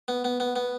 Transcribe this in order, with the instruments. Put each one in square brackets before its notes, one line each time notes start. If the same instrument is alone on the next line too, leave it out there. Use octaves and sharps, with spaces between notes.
[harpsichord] B3
B3
B3
B3